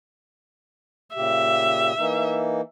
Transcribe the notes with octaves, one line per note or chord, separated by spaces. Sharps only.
A#2 C#3 G4 E5
E3 A#3 D#4